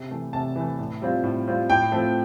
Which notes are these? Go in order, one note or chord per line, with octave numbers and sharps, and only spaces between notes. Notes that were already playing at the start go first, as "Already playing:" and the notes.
Already playing: C3
E3 A3
C3 A5
E3 A3
A2
G3 C4 F4
A2
G3 C4 F4
A2 G5
F3 A3 C4